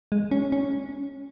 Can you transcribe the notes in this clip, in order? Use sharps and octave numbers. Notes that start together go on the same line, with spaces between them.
G#3
C#4
C#4